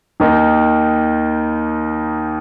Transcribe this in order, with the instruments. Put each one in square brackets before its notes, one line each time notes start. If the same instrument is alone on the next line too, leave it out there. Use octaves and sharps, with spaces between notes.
[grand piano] D#2 D#3 A#3 D#4